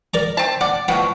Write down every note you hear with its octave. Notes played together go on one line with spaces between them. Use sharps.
A#4 D5 A#5
C4 A5
D5 F#5
B2 F3 F#3 F#5 G5